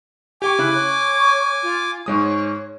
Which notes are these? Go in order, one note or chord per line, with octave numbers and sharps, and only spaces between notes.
G4 G5 G#5 C#6 D6
C#3 E4 F#6
C#5 F#6
F4
G#2 G#3 C#5 D#6